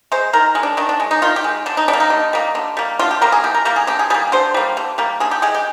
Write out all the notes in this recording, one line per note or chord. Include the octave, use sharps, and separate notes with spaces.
G#3 C5
D#3 A#4
G#3
D4
D#3 D4
D4
G#3
D#4
D#3 F4
G4
G#3
D3 D4
D#4
G3 D4
A#3
D#4
D3
G3 A#3
D3
G3 A#3
D3 F4
G4
G3 A#3 A#4
G#4
D3 G4
A#4
G3 A#3 A#4
G#4
D3 G4
G#4
G3 A#3 G#4
D3 C5
G3 A#3
D3
G3 A#3
D3 G#4
G4
G#3 G#4
G4